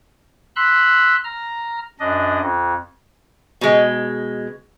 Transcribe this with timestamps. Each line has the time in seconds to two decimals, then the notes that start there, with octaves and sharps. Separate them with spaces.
0.56 B5 C6 E6 F#6
1.24 A#5 F6
2.00 F#2 D4 D#5
2.41 F2
3.61 B2 G#3